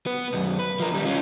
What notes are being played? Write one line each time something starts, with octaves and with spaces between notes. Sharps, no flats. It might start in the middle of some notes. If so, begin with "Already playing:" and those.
B3 B4
B1 F#2
B4
F3 A#4
D#2 G3
C#4 F4